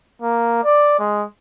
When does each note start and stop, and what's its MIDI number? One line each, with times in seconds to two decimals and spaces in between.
0.22 0.60 58
0.64 0.97 74
0.99 1.24 56